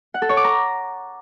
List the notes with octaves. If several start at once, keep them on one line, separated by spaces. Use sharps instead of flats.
F#5
A4
C#5
D6
A#5